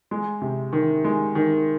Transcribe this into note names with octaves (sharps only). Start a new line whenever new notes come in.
G#3
C3
D#3
G#3
D#3